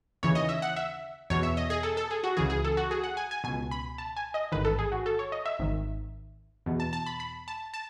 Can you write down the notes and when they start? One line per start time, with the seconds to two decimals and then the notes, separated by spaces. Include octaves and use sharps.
0.23 D#2 C#3 E3 C#5
0.35 D#5
0.49 E5
0.62 F#5
0.76 E5
1.30 E2 B2 C#5
1.43 E5
1.57 D#5
1.70 G#4
1.83 A4
1.97 A4
2.11 G#4
2.24 F#4
2.37 C#2 C#3 E3 G#4
2.50 G#4
2.64 A4
2.77 F#4
2.91 G#4
3.04 F#5
3.17 G#5
3.31 G#5
3.44 C#2 B2 G#5
3.71 B5
3.98 A5
4.17 G#5
4.34 D#5
4.52 A1 G#2 D#3 B4
4.65 A4
4.79 G#4
4.92 F#4
5.06 A4
5.19 C#5
5.32 D#5
5.46 E5
5.59 G#1 G#2 D#3
6.66 E2 B2
6.80 A5
6.93 A5
7.06 B5
7.20 B5
7.48 A5
7.74 A5